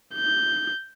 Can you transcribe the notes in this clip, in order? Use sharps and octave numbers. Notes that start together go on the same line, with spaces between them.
G6